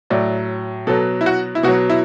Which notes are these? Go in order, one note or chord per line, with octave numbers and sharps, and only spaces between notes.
A2 F#3 D5
B2 F#3 A4
E4
F#4
E4
B2 F#3 F#4
E4